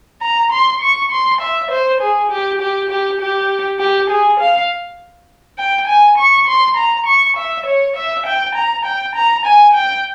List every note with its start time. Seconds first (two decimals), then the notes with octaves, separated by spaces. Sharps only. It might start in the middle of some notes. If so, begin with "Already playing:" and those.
0.22 A#5
0.53 C6
0.82 C#6
1.11 C6
1.41 E5
1.71 C5
2.01 G#4
2.31 G4
2.61 G4
2.90 G4
3.21 G4
3.79 G4
4.10 G#4
4.40 F5
5.58 G5
5.88 G#5
6.18 C#6
6.48 C6
6.77 A#5
7.06 C#6
7.37 E5
7.66 C#5
7.97 E5
8.26 G5
8.55 A#5
8.85 G5
9.15 A#5
9.46 G#5
9.74 G5